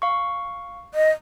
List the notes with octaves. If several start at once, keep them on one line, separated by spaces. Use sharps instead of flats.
F5 C#6
D#5